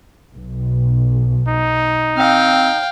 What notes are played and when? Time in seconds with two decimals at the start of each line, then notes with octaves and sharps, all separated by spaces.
0.35 B1
1.48 D#4
2.17 C4 F5 G5